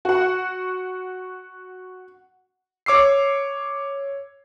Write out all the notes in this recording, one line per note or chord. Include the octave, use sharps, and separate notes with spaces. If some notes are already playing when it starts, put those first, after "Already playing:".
F#4 F#5
C#5 D6 E6 C7